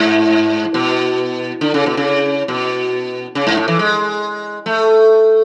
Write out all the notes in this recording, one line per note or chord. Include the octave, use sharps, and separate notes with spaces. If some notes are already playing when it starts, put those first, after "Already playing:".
Already playing: G#2
B2
D3
C#3
B2
C#3
B2
C#3
G#2
A2
E3
G#3
A3